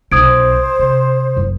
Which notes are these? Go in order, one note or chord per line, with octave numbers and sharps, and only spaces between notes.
B1 C5 D#6 G#6 D7
C3
F#1 F#2